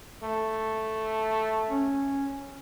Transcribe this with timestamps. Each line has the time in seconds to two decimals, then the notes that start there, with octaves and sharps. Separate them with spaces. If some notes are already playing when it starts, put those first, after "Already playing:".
0.23 A3
1.69 C#4